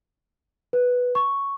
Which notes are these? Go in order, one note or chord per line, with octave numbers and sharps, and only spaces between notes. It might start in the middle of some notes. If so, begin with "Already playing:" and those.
B4
C#6